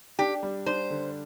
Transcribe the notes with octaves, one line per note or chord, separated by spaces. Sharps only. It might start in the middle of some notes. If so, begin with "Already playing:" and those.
D4 G4
G3
D4 C5
D3